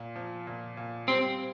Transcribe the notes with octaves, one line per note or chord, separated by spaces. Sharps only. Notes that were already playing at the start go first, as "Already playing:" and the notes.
Already playing: A#2
F3
A#2
A#2
G3 C4